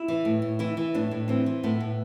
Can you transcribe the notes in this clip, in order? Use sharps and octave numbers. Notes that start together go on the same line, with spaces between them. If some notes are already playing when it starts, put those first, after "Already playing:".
Already playing: E4
E3
A2
A2
E3 E4
E3
A2 D4
A2
E3 C4
E3
A2 B3
A2